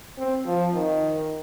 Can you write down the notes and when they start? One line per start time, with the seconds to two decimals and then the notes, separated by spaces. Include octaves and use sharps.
0.18 C4
0.46 F3
0.74 D#3